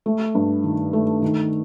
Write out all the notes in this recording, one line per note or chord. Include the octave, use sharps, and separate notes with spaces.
A3
G2
D#3
A3
D#3